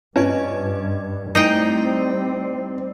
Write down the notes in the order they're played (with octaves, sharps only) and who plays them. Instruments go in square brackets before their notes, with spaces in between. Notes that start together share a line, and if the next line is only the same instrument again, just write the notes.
[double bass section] G2 [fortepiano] C#4 [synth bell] B4 D#5 G#6
[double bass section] G3 C4 [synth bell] A3 E4 C7 [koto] D#4 D#5 G5